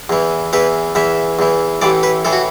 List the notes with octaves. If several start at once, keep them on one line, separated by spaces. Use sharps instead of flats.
E2 E3
E2 E3 B4
E2 E3 E5
E2 E3
A1 A2 E3 D5
B4
A2 E3 A4
F#4